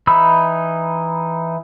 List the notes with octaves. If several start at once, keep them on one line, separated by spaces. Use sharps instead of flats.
E3 D#4 B5 E6